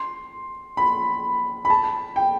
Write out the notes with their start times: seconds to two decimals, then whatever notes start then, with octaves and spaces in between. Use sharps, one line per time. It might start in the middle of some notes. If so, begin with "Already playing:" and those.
Already playing: C6
0.77 B5
1.65 B5
1.70 A5
2.16 G5